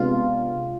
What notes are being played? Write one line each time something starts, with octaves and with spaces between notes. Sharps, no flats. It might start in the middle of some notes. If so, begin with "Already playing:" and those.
Already playing: C3 G#3 B3 D4 F4